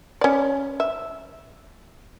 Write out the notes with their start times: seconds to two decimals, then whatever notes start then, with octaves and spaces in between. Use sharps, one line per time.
0.21 C#4 D5
0.80 E5